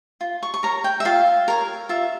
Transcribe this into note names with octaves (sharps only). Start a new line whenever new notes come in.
F4
C#6
C#6
A#4 C#5 A#5
G5
E5
F4 F5
A#4 C#5
F4 E5